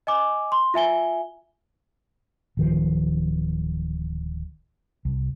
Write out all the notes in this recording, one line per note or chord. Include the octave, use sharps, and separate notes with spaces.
D#5 G#5 D6
C6
F4 E5 G#5 G7
D1 D#3 F3
C2